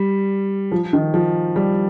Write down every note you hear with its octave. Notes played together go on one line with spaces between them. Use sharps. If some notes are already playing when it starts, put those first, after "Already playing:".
Already playing: G3
F3
D#3
F3
G3